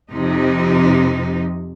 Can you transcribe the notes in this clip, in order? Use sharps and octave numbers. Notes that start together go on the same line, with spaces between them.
F2 C3 D#4